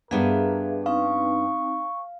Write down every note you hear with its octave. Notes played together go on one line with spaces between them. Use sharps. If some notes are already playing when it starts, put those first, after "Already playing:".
G2 B3 D4 G#4 A#4 E5 F5
C4 D#4 F5 C#6